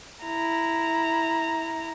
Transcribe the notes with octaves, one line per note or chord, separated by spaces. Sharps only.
E4 A#5